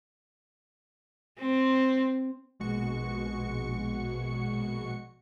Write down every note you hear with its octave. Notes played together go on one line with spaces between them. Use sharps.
C4
A#1 B2 G#3 F#4 C#6 C#7